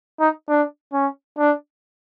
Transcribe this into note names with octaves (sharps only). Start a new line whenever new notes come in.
D#4
D4
C#4
D4